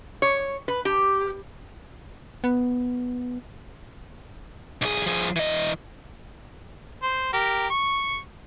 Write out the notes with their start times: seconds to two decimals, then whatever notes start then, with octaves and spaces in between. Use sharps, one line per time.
0.22 C#5
0.68 B4
0.85 G4
2.44 B3
4.82 B1 G#4
5.06 F3 G#4
5.36 E3 D#5
7.03 C5
7.33 G4 A#4
7.70 C#6